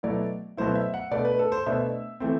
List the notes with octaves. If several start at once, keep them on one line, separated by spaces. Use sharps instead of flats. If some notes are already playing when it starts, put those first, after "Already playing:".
B2 F#3 A3 E4 D5
B2 F#3 A3 E4 C5
E5
F#5
B2 A3 D4 D5
B4
A4
C5
B2 A3 D4 E5
E3 A3 C4